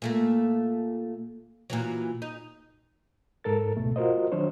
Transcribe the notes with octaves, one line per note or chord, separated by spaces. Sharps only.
A#2 A3 A#3
A#2 E3 F#3
D#4
G#2 A4 A#4 A6
C#2 B2 A3
F4 F#4 A#4 C5 D#5
D#3 F#3 D4 C5 C#5